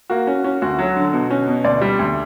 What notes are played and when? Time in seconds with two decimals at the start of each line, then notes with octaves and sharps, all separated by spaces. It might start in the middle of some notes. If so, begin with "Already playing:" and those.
0.10 A#3 F#4
0.27 C#4
0.44 C#4
0.62 D2 F#4
0.79 F#3
0.96 D3
1.13 B2
1.30 C#4
1.48 B2
1.64 D2 D5
1.81 G3
1.99 D2